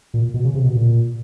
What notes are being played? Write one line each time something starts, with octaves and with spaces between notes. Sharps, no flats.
A#2
B2
C#3
C3
B2
A#2